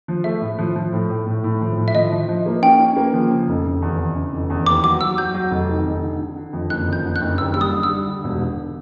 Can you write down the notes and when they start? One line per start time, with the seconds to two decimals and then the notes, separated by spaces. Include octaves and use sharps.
0.08 F3
0.24 A3 E5
0.41 A2
0.58 F3
0.76 F3
0.93 A2
1.10 A2
1.27 A2
1.44 A2
1.61 F3
1.78 A2
1.88 E5
1.95 F3 D#5
2.12 F3
2.29 F3
2.46 A#3
2.62 C#4 G5
2.80 C#4
2.96 A#3
3.14 F3
3.30 C#3
3.48 F1
3.65 F1
3.82 E2
3.98 E2
4.16 C#3
4.33 F1
4.50 E2
4.66 D#2 D6
4.84 F#3 D6
5.01 F#3 E6
5.18 F#3 G6
5.34 F#3
5.51 F1
5.69 D#3
5.86 F1
6.03 D3
6.19 D3
6.36 D3
6.53 F2
6.70 F#1 F#6
6.88 F2 G6
7.05 D3
7.16 F#6
7.21 F#1
7.38 D#2 E6
7.54 G3 E6
7.61 D#6
7.73 D3
7.83 E6
7.89 G3
8.07 D3
8.24 E1
8.40 D3